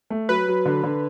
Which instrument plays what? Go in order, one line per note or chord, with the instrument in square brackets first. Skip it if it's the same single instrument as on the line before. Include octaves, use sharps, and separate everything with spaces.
[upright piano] A3
[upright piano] F#3 [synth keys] B4
[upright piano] F#3
D3
D3